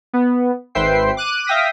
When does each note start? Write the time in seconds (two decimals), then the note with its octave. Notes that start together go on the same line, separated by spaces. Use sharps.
0.13 B3
0.75 G#1 B4 C5 E5 G5 C7
1.17 D6 F#6 D#7
1.47 E5 F5 G5 D#6 A#6 B6